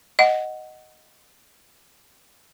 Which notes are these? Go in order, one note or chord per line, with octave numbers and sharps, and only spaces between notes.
D#5 F#5